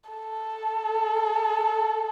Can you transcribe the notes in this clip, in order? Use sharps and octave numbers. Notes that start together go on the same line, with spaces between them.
A4